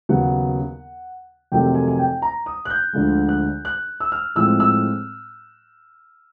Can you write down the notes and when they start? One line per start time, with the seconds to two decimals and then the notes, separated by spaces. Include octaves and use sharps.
0.09 D#2 C#3 F#3 B3 F#5
1.52 F2 C3 D#3 F#3 A3 G5
1.74 G#5
1.88 G#5
1.99 G5
2.22 A#5
2.46 D#6
2.65 F#6
2.70 G6
2.93 D2 D3 F3 G#3
3.29 F#6
3.65 F#6
4.00 E6
4.12 F6
4.35 A2 F3 G#3 C4 E6
4.60 E6